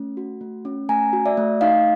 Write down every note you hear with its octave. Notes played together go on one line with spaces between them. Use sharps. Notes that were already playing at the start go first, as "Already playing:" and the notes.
Already playing: A3 C#4
F#4
A3
C#4
A3 G#5 A#5
F#4
D5 E5
A3
D#4 D#5 F5